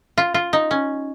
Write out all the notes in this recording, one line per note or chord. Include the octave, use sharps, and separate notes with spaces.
F4
F4
D#4
C#4